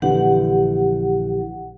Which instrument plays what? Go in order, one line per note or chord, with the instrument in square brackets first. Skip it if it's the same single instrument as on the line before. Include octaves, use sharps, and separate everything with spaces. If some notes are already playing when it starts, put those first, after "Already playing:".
[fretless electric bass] A#1 D3 E3 [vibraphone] G4 F#5